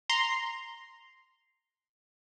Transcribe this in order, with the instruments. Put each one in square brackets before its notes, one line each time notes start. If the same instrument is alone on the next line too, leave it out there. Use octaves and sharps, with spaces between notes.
[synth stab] A#5 C6